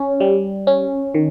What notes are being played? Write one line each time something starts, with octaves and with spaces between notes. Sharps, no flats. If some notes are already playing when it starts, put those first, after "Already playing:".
Already playing: C#4
G3
C#4
D#3